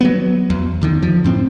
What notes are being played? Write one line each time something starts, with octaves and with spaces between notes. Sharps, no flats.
F#3 G3 B3
E2
E2 D3 D#3
F3
F#2 A2 C4